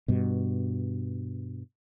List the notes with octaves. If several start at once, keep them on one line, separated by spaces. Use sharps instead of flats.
G2 B2